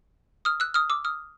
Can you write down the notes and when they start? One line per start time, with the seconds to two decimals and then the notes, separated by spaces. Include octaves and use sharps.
0.45 D#6 F6
0.60 E6 F#6
0.74 D#6 F6
0.90 D6 E6
1.05 D#6 F6